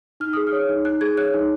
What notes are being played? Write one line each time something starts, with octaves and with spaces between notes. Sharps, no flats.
D#4 F6
G#4 D#6
F6
C#5
D#4
D#4 F#6
G#4 G#6
C#5 F#6
D#4